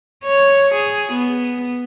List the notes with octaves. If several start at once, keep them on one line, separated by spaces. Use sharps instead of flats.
C#5
G#4
B3